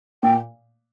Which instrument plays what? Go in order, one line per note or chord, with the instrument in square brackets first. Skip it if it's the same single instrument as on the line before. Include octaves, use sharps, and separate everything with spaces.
[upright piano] A#2 [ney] G5